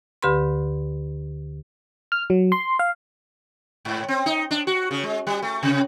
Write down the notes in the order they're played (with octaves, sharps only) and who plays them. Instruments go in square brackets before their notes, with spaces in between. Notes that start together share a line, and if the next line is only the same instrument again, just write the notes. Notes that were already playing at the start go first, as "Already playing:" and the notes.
[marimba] D2 D3 G4 B4 B5 C6
[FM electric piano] F6
F#3
C6
F5
[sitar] G#2
C4
D#4
D4
F#4
C#3
G#3
G3
A3
C3